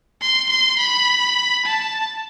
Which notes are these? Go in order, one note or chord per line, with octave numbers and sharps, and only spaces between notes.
C6
C6
B5
A5